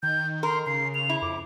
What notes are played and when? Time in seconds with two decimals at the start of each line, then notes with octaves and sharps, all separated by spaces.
0.03 D#3 G6
0.43 A#4 C6
0.67 C#3 C7
0.95 F7
1.09 E4
1.22 F2 D6